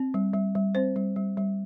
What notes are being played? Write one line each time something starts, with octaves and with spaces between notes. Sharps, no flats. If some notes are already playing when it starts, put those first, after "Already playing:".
Already playing: C4
G3
G3
G3
C4 C5
G3
G3
G3